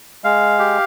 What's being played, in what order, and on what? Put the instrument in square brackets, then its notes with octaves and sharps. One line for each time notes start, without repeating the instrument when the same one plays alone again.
[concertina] G#3 F5
G4